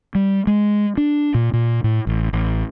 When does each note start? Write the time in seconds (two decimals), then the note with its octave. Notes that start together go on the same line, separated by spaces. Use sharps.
0.15 G3
0.47 G#3
0.97 D4
1.34 A#2
1.53 A#2
1.84 A2
2.07 A1
2.33 A1